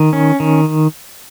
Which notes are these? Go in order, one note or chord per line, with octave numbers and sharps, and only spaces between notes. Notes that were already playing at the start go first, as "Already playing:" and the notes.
Already playing: D#3
C#4
D#3